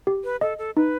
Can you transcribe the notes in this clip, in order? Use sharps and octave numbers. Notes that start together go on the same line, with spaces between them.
G4
B4
A4 D#5
A4
D#4 B4